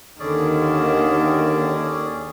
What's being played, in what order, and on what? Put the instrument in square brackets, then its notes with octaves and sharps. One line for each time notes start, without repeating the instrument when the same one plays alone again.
[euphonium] D#2 [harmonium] D3 [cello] D#3 [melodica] C#4 G#4 D5